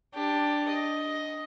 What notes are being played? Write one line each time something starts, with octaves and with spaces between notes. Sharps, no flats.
D4 G4
D#5